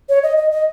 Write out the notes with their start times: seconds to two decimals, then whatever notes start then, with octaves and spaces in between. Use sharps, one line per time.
0.09 C#5
0.23 D#5
0.37 D#5
0.51 D#5